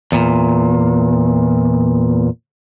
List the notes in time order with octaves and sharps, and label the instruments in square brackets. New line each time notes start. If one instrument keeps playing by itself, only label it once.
[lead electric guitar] E2 A#2